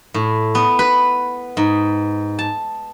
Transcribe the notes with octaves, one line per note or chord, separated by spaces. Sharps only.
A2
B3
B4
G#2
A5